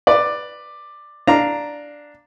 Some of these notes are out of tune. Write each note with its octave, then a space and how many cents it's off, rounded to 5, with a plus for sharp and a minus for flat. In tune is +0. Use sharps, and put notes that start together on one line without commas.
B4 +0 D5 +10
D4 +0 F5 +0 A#5 +0